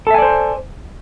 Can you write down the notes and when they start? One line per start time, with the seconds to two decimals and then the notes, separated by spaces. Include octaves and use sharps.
0.07 A4
0.11 E5
0.14 G#5
0.18 D5
0.22 C5